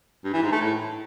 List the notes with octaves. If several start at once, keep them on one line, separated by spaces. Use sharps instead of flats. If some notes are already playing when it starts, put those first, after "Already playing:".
G2
E3
G#2
A3
A2